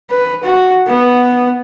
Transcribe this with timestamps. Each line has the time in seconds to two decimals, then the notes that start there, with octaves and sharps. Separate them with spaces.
0.11 B4
0.44 F#4
0.87 B3